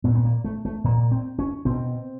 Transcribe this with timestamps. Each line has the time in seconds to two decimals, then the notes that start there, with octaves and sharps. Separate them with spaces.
0.04 A#2 B3
0.15 B3
0.25 A#3
0.44 A3
0.65 A3
0.84 A#2 A#3
1.11 C4
1.39 C#4
1.65 B2 C4